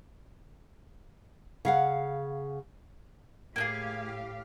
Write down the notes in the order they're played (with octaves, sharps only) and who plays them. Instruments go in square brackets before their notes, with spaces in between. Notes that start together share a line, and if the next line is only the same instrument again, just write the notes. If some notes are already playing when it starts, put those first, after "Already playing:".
[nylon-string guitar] C#3 F5 F#5
[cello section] A2 G4 F5 [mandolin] A#3 D#4 G#4